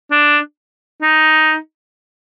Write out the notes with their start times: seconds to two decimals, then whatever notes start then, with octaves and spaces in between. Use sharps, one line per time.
0.11 D4
1.02 D#4